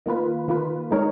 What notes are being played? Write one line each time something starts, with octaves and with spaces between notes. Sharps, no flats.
D#3 A#3 F4 B4
D#3 A#3 F4 B4
D#3 G#3 D#4 A#4 C#5